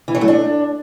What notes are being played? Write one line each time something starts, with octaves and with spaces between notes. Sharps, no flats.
E3
F#3
A3
D4